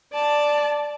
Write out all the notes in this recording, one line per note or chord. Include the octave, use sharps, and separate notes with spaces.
D5 A5